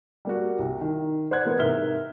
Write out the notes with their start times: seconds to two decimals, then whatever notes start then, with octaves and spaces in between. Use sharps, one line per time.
0.25 G3 A#3 F#4
0.59 C2
0.81 D#3
1.31 C5 D5 F#5 F#6 G#6
1.45 E3 A#3 B3
1.58 G#2 C3 A#4 E5 F6 G7